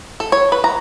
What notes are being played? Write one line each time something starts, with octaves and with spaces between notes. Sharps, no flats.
A4
C#5
B4
A#5